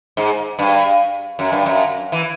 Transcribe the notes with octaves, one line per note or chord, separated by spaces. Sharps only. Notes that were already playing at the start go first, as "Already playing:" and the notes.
G#2
G2
F#2
G2
F#2
E3